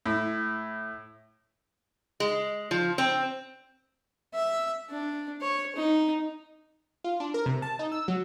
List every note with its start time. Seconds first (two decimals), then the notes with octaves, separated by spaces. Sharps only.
0.06 A2
2.20 G#3
2.71 F3
2.98 C4
4.34 E5
4.90 D4
5.41 C#5
5.75 D#4
7.04 F4
7.20 D4
7.34 A#4
7.46 C3
7.62 A5
7.79 D#4
7.92 E6
8.08 F#3